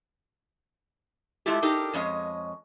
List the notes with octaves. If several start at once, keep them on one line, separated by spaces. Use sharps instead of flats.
G#3 A3 E4 F4 G4
D4 D#4 G4 A4 A#4
F2 G#3 C#4 D#5